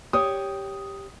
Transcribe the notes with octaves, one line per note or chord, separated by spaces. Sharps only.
G4 C#5 D#6